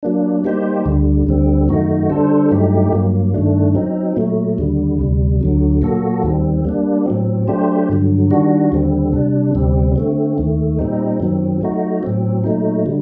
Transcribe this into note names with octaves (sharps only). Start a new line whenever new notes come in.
F#3 A#3 D4
G3 A#3 D#4 G4 C5
D2 D3 G3
D2 D3 G3 C4
F#2 D#3 A3 D#4 F#4
D3 G3 D4 A4 C5
G2 F#3 A3 D#4 G4
G2 F#3 A#3
G2 D#3 A3 D4
F#3 C4 D#4
A#2 F#3 A3
D#2 D3 G3
D2 C3 G3
D2 D3 F#3
A#2 F#3 A#3 F#4 A4
D#2 D#3 G3 C4
G3 A#3 D4
A2 F#3 C4
F#3 A3 D4 G4 C5
G2 D3 F#3
D#3 G3 D4 F#4
D#2 D3 G3 C4
C3 G3 D4
D2 C3 G3 C4
D3 A3 C4
D#2 D#3 A3
A#2 G3 C4 D#4
F#2 D#3 F#3 C4
F#3 A3 D#4 F#4
A2 F#3 C4
A#2 F#3 A3 D#4
D3 G3